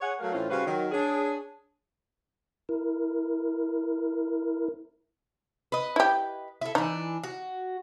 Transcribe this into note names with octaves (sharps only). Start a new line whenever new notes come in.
G#4 C#5 F#5
F#3 A3 F#4 A#4 F5
A2 E3 C4 C#4 F4
C#3 G3 F#4 B4 C5 F5
D#3 F#3
D4 G#4 C#5
E4 A#4
B4 D#5
E4 G4
E4 A4
E3 D4 D#4
F#4